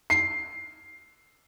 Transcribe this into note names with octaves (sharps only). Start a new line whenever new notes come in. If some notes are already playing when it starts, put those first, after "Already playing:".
C7